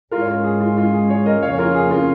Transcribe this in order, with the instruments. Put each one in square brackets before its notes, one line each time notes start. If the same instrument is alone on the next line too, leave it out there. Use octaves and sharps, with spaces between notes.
[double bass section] G#2 G#3 C#4 [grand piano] F4 A#4
[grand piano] C#5
F4 A#4
G#4
F4
F4
G#4
G#4 C#5
A#4 D#5
[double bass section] F2 C#3 A#3 C#4 [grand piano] C#5 F5
[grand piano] C#5
F4 A#4
G#4
F4 A#4